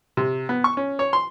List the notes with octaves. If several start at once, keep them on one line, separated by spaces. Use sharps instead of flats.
C3
B3
C#6
C#4
C#5
C6